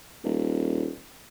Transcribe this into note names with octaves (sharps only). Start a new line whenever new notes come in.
D#1